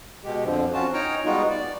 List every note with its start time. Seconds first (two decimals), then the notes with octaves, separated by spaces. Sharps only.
0.24 B2 G#3 G4
0.45 F2 D3 F3
0.74 C4 C#4 F4 F#4 A5
0.94 D#4 C#5 G5 A#5 F6
1.25 G3 G#3 B3 D#4 F4 F#4
1.50 D5